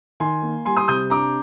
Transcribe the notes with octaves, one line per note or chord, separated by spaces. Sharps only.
D#3 G#5 C6
A#3
G3 G#5 C6
C6 D#6
C3 D#6 G6
D4 A#5 D6